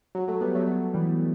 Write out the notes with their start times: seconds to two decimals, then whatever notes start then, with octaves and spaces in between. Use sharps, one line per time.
0.15 F#3
0.28 F#3 A3
0.41 G3 B3
0.55 F#3 A3
0.67 F#3 A3
0.94 E3 G3